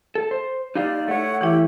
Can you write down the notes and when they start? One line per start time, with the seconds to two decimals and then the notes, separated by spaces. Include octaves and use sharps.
0.15 A4
0.31 C5
0.75 D#4 G4 D5 F5
1.08 A3 C#5 F#5
1.41 E3 E4 G4